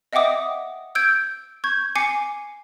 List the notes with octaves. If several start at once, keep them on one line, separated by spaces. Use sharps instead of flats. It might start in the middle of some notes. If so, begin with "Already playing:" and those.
D#5 E5 F#5 G5 D6 D#6
E6 G6 G#6 D7
C#6 G6 G#6
G#5 D6 C7 C#7